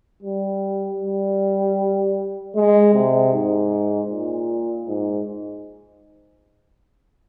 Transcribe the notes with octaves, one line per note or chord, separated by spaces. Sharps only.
G3
G3
G#3
C3
G#2
A#2
G#2